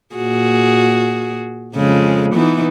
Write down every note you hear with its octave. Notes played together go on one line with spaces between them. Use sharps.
A#2 F#4 G#4
F2 C#3 G#3
E3 B3 D#4